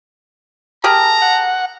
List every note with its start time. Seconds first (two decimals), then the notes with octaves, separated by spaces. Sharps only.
0.84 G4 G#4 A#4 A5 A#5
1.22 F#5